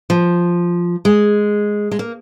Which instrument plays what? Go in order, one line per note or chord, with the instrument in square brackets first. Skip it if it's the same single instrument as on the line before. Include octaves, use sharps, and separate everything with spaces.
[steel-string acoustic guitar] F3
G#3
G#3
A#3